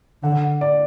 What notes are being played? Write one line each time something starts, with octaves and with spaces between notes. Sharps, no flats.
D3 F#5
D5